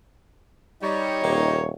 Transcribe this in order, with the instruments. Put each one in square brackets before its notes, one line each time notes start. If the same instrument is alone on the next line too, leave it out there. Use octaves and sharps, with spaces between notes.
[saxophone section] G3 [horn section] D#4 C#5
[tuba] D#1 [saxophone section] A#3 G4